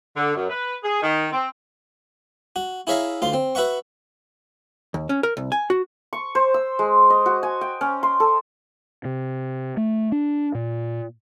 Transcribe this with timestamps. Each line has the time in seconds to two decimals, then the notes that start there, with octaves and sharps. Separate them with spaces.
0.16 D3
0.36 F#2
0.50 B4
0.84 G#4
1.02 D#3
1.32 C4
2.56 F#4
2.87 E4 G#4 C#5 E5 F5 A#5
3.22 D2 F4 C6
3.33 C4
3.55 F#4 B4 E5 F#5 C#6
4.94 D#2
5.09 C#4
5.23 A#4
5.37 C2
5.52 G#5
5.70 F#4
6.13 C#6
6.35 C5
6.54 E6
6.79 G#3
7.10 D#5
7.26 F#4
7.43 G#5
7.61 G5
7.81 C#4
8.03 C6
8.20 A4
9.05 C3
9.77 A3
10.12 D4
10.55 A#2